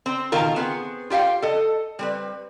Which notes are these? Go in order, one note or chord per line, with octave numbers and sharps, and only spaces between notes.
C4
B2 D#3 F4 A#4
B3 C4 G#4
F4 G4 E5 F5 G5
A4 D#5
G3 C4 B4